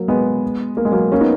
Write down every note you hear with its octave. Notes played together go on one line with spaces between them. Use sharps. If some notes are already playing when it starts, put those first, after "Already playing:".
Already playing: F#3 A#3
G#3 B3
A#3
G#3
F#3 A#3
A#3 C#4
B3 D#4